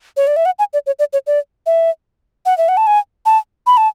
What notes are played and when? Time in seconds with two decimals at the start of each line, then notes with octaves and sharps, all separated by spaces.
0.17 C#5
0.27 D5
0.36 E5
0.46 F#5
0.59 G#5
0.73 D5
0.87 C#5
0.99 D5
1.13 C#5
1.27 D5
1.66 E5
2.46 F#5
2.58 E5
2.68 F#5
2.77 A5
2.87 G#5
3.26 A5
3.67 B5
3.77 A5